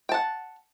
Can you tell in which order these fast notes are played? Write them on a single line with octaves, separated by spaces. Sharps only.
G5 A5 F#5